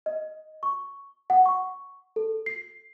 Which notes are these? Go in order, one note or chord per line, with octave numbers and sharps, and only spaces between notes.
D#5
C#6
F#5
C#6
A4
C7